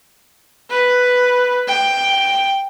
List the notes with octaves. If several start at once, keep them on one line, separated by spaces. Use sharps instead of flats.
B4
G5